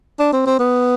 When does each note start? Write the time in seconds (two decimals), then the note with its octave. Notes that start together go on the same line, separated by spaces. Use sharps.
0.19 D4
0.33 C4
0.46 C4
0.59 B3